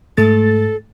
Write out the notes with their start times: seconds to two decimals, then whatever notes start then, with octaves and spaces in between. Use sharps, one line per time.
0.17 G#2 A3 A4 A6